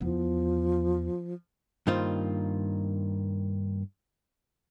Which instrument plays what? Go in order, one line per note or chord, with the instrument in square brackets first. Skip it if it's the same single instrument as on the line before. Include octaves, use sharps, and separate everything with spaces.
[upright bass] E2 B3 [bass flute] F3
[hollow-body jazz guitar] G2 D#3 A#3 D#4 F4 C5